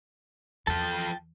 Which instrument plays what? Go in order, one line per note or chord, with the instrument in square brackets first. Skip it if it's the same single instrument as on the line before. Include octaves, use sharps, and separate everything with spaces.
[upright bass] E2 [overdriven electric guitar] F3 A4 [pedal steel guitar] G5 A5